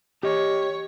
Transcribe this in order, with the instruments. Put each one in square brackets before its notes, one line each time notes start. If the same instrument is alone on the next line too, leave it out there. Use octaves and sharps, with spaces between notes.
[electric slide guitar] G4 D#5 [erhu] C#5